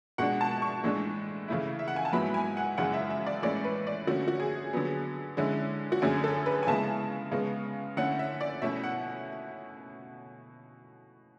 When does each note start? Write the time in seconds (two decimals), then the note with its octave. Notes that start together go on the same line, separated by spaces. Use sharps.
0.18 B2 G#3 D4 F#5
0.41 A5
0.62 C#6
0.84 A2 E3 G#3 D4
1.48 C#3 E3 A3 E4
1.79 E5
1.88 F#5
1.96 G#5
2.05 A5
2.13 G#2 F#3 B3 E4 B5
2.34 G#5
2.57 F#5
2.77 F#2 C#3 E3 G#3 F#5
2.94 E5
3.10 E5
3.26 D5
3.43 A2 E3 G#3 C#4 E4 D5
3.64 B4
3.87 D5
4.07 D3 A3 C#4 F#4
4.28 F#4
4.40 G#4
4.73 D3 F#3 B3
5.37 D3 G#3 C#4 E4
5.92 F#4
6.02 F#2 D3 A3 C#4 G#4
6.24 A4
6.46 B4
6.63 G#5
6.67 C#3 G#3 B3 E4 A5
7.32 C#3 G#3 B3
7.97 D3 A3 C#4 E4 F#5
8.19 E5
8.41 D5
8.62 B2 A3 C#4 E4 E5
8.84 F#5